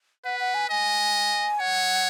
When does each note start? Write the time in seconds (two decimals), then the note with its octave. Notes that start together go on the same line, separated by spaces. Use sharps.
0.25 B4 F#5
0.40 F#5
0.54 G#5
0.69 D#5 G#5
1.59 C#5 F#5